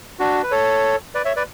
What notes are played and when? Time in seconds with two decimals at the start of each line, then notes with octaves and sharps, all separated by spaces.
0.19 D4 F#4
0.43 B4
0.51 A4 C#5
1.15 B4 D5
1.25 C#5 E5
1.36 B4 D5